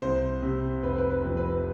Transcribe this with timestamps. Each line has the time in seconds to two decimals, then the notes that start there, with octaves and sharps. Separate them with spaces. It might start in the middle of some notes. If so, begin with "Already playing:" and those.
0.02 C2 C5
0.42 C3
0.83 F1 B4
0.91 C5
0.98 B4
1.10 B4
1.24 F2
1.37 B4